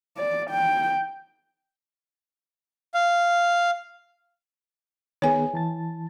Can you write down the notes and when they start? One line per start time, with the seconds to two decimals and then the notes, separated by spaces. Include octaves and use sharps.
0.18 D5
0.51 G5
2.94 F5
5.22 D#3 B3 G#4 C#5 G#5
5.54 E3 A5 A6